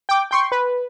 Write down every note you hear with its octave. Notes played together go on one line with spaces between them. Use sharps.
G5 D6
G5 C6 C#6
B4